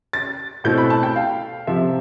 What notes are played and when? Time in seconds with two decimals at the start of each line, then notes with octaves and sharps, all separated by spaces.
0.13 A6
0.64 B2 A3 C4 E4 G6
0.78 B5
0.90 A5
1.03 G5
1.16 F5
1.67 C3 F3 C4 E5